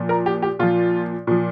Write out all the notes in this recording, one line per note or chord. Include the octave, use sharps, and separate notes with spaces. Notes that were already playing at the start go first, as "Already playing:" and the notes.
Already playing: A#2 F3
A#4
G4
G4
A#2 F3 F4
A#2 F3